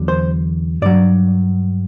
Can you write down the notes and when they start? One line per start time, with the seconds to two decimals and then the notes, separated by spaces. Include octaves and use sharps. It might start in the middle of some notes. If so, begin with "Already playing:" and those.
Already playing: E2 D3 F#3
0.08 C5
0.82 G2 F#3 D5